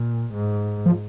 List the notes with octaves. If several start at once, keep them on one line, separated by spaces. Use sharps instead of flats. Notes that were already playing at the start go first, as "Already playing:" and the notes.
Already playing: A#2
G#2
F3